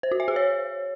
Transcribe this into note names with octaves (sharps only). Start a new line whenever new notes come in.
C5
F#4
E5
G#4
C#5